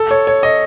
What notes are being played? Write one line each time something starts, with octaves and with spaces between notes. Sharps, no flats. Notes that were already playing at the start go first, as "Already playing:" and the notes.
Already playing: A4
C#5
C#5
D#5